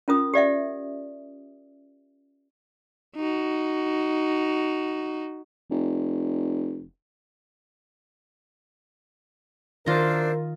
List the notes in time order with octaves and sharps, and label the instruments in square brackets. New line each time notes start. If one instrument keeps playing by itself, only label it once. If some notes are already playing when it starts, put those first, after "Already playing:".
[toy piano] C#4 F4 A#4 D#6
G4 D5 E5 F#5
[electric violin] D#4 F#4
[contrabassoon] F1
[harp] D#3 A6 [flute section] D4 E4 C5 [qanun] F4 D#5 [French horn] A#4